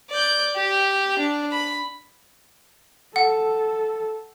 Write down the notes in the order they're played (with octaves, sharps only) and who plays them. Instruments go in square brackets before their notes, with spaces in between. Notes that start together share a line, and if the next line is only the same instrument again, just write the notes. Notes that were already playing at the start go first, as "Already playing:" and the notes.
[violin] D5 G6
G4
D4
B5
[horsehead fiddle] A4 [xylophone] F#5